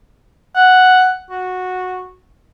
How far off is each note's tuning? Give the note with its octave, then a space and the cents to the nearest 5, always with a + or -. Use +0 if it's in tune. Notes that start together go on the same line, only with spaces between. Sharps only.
F#5 +0
F#4 -10